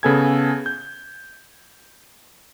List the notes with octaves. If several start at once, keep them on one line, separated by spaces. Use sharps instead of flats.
C#3 B3 A4 G#5 G#6
G6